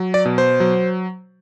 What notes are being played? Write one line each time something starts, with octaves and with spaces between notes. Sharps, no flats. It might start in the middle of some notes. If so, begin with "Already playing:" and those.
Already playing: F#3
D5
B2
C5
F#3